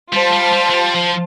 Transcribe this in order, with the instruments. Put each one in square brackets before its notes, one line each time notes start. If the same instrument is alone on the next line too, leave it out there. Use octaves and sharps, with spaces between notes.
[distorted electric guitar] G3 [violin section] F4 C5 A5
[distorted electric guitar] G3
G3
A3
G3
F3